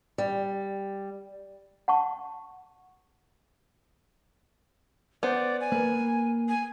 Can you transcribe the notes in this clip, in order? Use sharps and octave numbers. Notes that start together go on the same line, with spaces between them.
G3
F#5 A5 C#6
B3 C5 D5
G#5
A#3 A#4 B4
G#5